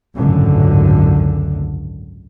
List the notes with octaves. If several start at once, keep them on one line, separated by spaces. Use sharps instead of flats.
G#1 C#2 F#2 A2 D3